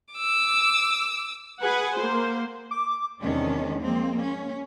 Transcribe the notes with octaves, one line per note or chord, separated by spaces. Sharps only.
D6 E6
G#4 B4 F#5 G#5
A#3 C5
D6
E2 C3 D#3 G#3 C#4 D4
F3 G#3 A#3 C4
C#4